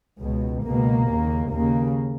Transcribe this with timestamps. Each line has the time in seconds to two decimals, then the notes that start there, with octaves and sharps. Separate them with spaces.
0.21 C#2 B2
0.64 C#2 B2 A#3
1.08 D#2 C#3
1.52 D#2 C#3 A#3